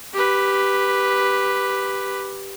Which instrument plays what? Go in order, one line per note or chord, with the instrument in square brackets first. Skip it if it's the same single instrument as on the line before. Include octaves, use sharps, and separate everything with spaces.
[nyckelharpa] G4 B4